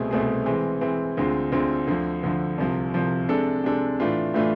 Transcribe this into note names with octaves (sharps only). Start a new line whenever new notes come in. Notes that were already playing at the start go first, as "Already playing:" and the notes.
Already playing: C2 B2 A3 C4 G#4
C2 B2 A3 C4 G#4
E3 G#3 C4
E3 G#3 C4
D2 D3 G#3 C4 F4
D2 D3 G#3 C4 F4
D2 D3 F3
D2 D3 F3
C2 C3 F3
C2 C3 F3
C3 G#3 D4 A4
C3 G#3 D4 A4
A2 E3 A3 D4 F4
A2 E3 A3 D4 F4